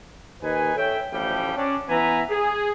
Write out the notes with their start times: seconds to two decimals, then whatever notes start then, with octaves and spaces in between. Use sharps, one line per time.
0.42 D#2 D#3 D#4 B4 G#5
0.76 A4 C#5 E5 G5
1.12 A1 D2 E3 F3 G3 G5
1.55 C#4 D4
1.89 E3 B3 B4 E5 G#5 A#5
2.30 G#4